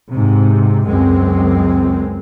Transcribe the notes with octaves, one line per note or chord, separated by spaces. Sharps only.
G#2 C3
C#2 F#2 G#3 C4